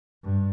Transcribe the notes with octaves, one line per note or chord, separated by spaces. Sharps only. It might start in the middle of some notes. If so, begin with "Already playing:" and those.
G2